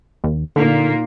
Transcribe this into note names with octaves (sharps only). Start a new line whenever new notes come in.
D#2
A#2 D3 A#3 D#4